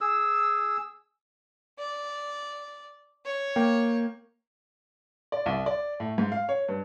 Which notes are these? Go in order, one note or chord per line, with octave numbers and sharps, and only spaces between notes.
G#4 E6
D5
C#5
A#3 G5
D5
C2
D5
A2
G#2
F5
C#5
G2